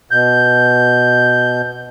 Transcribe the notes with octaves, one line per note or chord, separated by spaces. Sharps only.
B2 G6